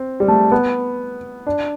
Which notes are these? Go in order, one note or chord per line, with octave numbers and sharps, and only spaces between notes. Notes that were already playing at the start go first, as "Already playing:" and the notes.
Already playing: C4
G3
A3
B3
D4